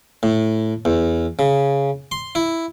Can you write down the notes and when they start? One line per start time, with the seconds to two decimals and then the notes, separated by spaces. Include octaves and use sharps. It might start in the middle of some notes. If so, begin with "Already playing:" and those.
0.23 A2
0.85 E2
1.39 C#3
2.12 C6
2.35 E4